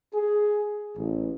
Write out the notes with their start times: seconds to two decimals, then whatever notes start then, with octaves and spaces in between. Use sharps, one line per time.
0.13 G#4
0.96 A1